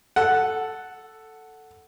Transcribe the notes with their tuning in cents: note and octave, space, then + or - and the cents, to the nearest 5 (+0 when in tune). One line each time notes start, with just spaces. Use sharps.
A4 +0 F#5 +0